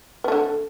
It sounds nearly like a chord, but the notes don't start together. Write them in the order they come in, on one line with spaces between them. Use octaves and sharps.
B3 A3 D3